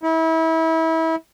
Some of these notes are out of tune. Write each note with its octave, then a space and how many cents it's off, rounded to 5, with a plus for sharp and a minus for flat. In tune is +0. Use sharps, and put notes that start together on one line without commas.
E4 -30